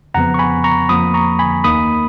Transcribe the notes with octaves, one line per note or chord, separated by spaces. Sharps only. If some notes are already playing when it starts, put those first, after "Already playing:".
F2 C#3 F3 B3 F#5 A#5
C#6
G#5 B5
A#5 C#6
F2 F3 A#3 B5 D#6
A#5 C#6
G#5 B5
D#2 D#3 A#3 D#4 B5 D#6